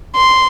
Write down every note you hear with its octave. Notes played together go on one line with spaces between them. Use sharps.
C6